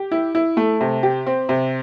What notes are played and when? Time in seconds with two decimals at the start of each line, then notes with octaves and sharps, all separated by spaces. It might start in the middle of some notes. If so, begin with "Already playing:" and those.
Already playing: G4
0.11 E4
0.35 E4
0.57 A3
0.81 C3
1.03 G4
1.26 C4
1.49 C3